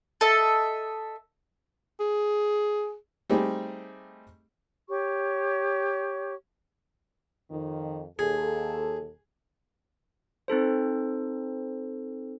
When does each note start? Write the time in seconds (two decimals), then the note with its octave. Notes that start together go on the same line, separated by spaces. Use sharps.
0.21 A4 D#5 E5
2.00 G#4
3.30 G3 A3 C4 D#4 G4 G#4
4.88 G4 C#5 C#6
7.50 F2 D#3
8.19 D#2 G#4 A4
10.48 C4 D#4 A4 C5